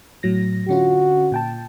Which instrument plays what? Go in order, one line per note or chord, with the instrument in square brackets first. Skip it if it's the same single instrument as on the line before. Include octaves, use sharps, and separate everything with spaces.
[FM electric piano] A2 F#3 A#6
[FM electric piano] D3 C#4 F4 [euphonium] F#4
[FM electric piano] A#2 G5 A5